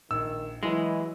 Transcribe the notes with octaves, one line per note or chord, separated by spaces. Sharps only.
A#1 D#3 E6
E3 F#3 G#3 E4